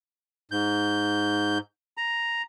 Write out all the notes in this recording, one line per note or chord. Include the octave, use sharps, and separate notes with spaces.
G#2 G6
A#5